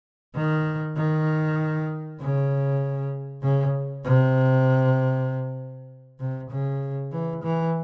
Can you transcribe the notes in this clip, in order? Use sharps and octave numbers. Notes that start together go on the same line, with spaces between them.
D#3
D#3
C#3
C#3
C3
C3
C#3
E3
E3